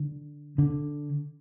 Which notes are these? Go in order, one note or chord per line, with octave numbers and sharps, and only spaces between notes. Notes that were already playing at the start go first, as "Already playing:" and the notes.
Already playing: D3
D3